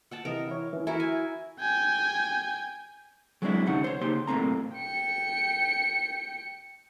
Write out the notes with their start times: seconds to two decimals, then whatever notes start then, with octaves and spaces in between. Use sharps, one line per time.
0.11 F#5 G5 A5
0.25 C3 E3 A#4 D#5
0.48 E4 C#5
0.73 E3 C#4
0.87 E4 F#4 A#4 G#5
1.00 E4 G#5
1.60 G5 G#5
3.42 F#3 G#3 B3 C4 D4 E4
3.66 D2 C3 C#4 D#4 F#5
3.84 C5 C#5
4.01 C#3 A#3 D#4 G4 C6
4.27 B1 A2 A3 A#3 C4 A#5
4.75 G5 C#7